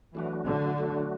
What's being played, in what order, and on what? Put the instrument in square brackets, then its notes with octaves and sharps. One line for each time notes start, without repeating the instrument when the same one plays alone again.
[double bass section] E3 [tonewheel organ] F#3 A3 D4 F#4
[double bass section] D3
[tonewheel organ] F#3 A3 D4 F#4